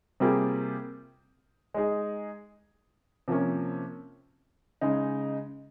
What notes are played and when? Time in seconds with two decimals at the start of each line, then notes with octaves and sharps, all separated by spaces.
0.20 C3 G3 A#3 F4 G#4
1.74 G#3 D#4 G#4
3.28 C3 F3 A#3 C#4
4.81 C#3 G#3 D#4